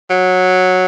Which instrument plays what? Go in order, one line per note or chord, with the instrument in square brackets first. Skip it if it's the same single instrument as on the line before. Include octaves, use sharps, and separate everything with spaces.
[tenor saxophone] F#3